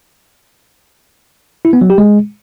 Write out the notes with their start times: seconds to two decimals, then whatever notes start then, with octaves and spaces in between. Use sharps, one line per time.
1.65 E4
1.73 B3
1.81 F#3
1.90 G4
1.98 G#3